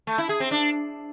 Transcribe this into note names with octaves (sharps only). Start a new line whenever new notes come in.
A3
E4
G#4
C4
D4